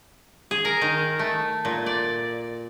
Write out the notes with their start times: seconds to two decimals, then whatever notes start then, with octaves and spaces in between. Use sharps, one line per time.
0.51 G#4
0.65 A#4
0.81 D#3
1.19 A3
1.65 A#2
1.86 D5